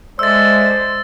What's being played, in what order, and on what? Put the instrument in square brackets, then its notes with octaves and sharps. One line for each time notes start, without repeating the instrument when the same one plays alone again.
[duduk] G#3 [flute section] A4 D5 E5 [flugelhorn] C5 [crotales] E6 A6